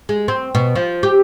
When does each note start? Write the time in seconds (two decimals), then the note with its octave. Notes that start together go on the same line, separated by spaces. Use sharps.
0.09 G#3
0.28 C4
0.55 B2
0.75 F3
1.03 G4